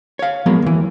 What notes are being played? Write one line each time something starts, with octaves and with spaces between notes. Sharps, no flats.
C#5 F5
F3 F#3 G#3 A#3 B3
D#2 E3